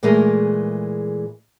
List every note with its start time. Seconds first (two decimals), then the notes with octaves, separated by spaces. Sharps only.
0.03 A#2 E3 G#3 A3 G#4 A#4